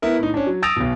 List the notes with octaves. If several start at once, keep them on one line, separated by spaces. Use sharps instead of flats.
B3 E4 A#4
A2 D#4
C#4 D4
F#3
D#6 E6 A6 A#6 D7 F7
B1 B2